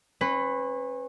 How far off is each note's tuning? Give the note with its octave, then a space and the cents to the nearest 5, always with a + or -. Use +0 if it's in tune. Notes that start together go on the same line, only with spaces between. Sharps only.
C#4 -35 B4 +15